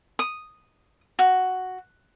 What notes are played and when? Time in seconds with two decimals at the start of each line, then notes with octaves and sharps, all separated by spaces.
0.19 D#6
1.19 F#4